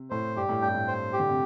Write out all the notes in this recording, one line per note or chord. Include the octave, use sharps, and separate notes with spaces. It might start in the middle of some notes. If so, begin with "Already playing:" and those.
Already playing: C3
A2 C5
G2 G4
A2
G2 G5
A2
C5
G4
D3
C3